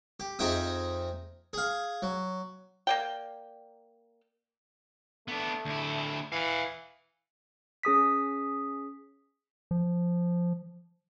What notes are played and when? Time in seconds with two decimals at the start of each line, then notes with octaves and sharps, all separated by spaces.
0.20 G4
0.39 F2 D#4 G#4 E5 G5 D#6
1.53 G#4 F5
2.02 F#3
2.87 A#3 D5 G5
5.28 A3 B3 D4
5.65 D2 E4
6.32 E3 F5 F#5
7.83 C#4 G#4 D#6 B6
9.71 F3